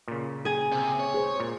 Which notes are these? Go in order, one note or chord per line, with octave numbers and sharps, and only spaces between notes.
A#2 C#3
G#4 G#5
C3
C#5
G#4 C5
A#2